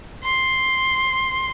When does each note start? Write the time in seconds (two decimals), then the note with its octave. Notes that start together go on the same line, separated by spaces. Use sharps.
0.24 C6